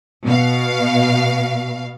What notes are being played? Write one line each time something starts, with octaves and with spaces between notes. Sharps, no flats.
B2 F5